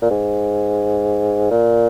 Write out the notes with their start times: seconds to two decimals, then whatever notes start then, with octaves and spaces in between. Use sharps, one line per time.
0.02 A#2
0.11 G#2
1.51 A#2